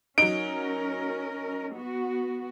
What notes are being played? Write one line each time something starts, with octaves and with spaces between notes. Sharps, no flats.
F#3 C#4 D#4 A#4 D7
B3 F#4